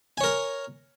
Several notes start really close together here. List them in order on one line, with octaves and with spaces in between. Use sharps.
G#5 C#5 A#4